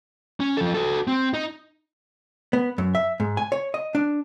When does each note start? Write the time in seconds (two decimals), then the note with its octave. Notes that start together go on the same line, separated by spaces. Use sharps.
0.40 C#4
0.57 F3 A4
0.74 F#4 A4
1.07 C4
1.34 D#4
2.53 B3
2.78 F#2
2.95 E5
3.20 G#2
3.37 G#5
3.52 C#5
3.74 D#5
3.95 D4